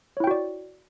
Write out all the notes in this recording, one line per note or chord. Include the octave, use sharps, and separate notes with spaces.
E4 F#4 C#5 D5 G5